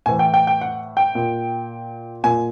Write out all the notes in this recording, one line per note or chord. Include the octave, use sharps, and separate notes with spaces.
A2 E3 G#5
G5
G5
G5
F#5
G5
A#2
A#2 G#5